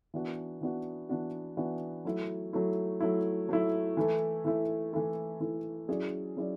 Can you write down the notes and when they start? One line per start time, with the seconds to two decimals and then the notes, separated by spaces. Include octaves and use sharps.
0.14 E3 B3 D4 F#4
0.61 E3 B3 D4 F#4
1.09 E3 B3 D4 F#4
1.57 E3 B3 D4 F#4
2.05 F#3 A3 E4
2.53 F#3 A3 E4
3.00 F#3 A3 E4
3.49 F#3 A3 E4
3.97 E3 A3 E4 A4
4.45 E3 A3 E4 A4
4.93 E3 A3 E4 A4
5.40 E3 A3 E4 A4
5.88 F#3 C#4 E4 G#4 D5
6.36 F#3 C#4 E4 G#4 D5